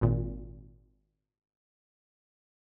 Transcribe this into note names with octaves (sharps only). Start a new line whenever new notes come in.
G#1 A#2